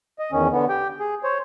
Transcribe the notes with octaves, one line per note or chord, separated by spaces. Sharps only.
D#5
E2 D#3 C#4
D3 B3
G4 G5
G#4
C5 C#5